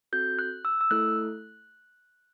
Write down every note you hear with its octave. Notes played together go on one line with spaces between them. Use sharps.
C4 F#4 A4 G6
F#6
E6
E6
A3 E4 A4 F#6